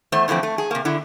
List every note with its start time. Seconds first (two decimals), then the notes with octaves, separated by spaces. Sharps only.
0.12 E2 A3 C5 E5
0.28 D3 E3 F3 A3 C4
0.43 A3
0.58 G#4
0.71 C3 A#3
0.85 D3 E4